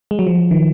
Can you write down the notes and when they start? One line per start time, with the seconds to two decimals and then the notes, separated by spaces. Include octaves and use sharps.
0.11 G#3
0.19 F#3
0.27 F3
0.51 D#3